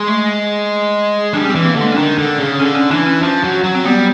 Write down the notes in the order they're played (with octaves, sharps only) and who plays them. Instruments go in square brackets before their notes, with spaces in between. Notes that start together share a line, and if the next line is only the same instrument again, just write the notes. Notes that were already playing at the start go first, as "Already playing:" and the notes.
Already playing: [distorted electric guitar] G#3
[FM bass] A3
[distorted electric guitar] G3 [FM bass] D4
[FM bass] C#4
[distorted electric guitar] E3 [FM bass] C4
[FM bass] A#3
[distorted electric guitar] D3
[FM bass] G#3
C#4
[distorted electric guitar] D#3 [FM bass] D4
[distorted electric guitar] D3
C#3
[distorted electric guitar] D3 [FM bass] C#4
[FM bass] C#4
[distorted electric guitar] E3 [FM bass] D4
[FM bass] C#4
[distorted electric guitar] F3
F#3
F#3
[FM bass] C4
[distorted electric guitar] G3 [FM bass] B3